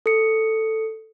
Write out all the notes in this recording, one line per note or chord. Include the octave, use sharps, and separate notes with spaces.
A4 C#7